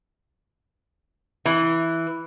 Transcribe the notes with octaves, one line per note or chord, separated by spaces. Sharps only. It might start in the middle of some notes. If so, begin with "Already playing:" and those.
E3